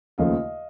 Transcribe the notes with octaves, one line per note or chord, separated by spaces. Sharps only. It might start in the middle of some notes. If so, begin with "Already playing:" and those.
D#2 C#3 F3 A3 D#5 F5